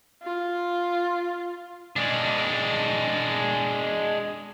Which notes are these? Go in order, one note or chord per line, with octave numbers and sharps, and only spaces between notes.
F4
G#3 D4